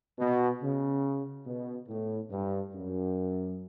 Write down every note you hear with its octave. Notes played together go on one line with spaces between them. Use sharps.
B2
C#3
B2
A2
G2
F#2